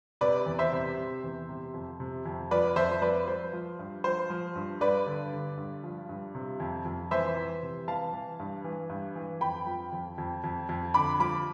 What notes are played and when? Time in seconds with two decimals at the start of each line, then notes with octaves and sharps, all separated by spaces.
0.21 C3 B4 D5
0.46 E2
0.59 C5 E5
0.72 C3
0.98 C3
1.24 E2
1.49 C3
1.74 F2
2.00 C3
2.26 F2
2.51 F3 B4 D5
2.76 F2 C5 E5
3.02 F3 B4 D5
3.28 F3 C5
3.53 F3
3.79 G2
4.04 F3 C5
4.30 F3
4.56 G2
4.81 G2 B4 D5
5.06 D3
5.33 D3
5.58 G2
5.84 F3
6.09 G2
6.35 C3
6.60 F2
6.85 F2
7.11 E3 C5 E5
7.37 E3
7.63 C3
7.88 E3 F5 A5
8.13 E3
8.40 G2
8.64 E3
8.89 G2
9.16 E3
9.41 F2 G5 B5
9.67 F3
9.92 F2
10.18 F2
10.44 F2
10.69 F2
10.94 D3 B5 D6
11.20 F3 B5 D6